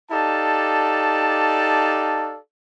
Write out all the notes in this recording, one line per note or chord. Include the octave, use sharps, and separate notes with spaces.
D#4 G4 A4 D5 F5 A5